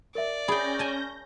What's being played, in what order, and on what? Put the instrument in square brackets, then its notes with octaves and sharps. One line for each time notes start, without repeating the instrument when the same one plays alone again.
[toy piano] A#4 E5 [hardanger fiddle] D5
[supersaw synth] C#4 G6 A#6 [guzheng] G#4 G5 [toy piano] B5
[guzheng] G#5 A5